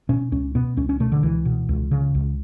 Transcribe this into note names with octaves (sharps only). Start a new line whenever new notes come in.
B2 C#4
C#2 C#4
B2 B3
C#2 C#4
C#4
B2 A3
D3
C#2 E3
B2
C#2
C#3
C#2